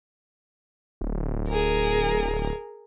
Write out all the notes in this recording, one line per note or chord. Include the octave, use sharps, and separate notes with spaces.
D1
G#4 A#4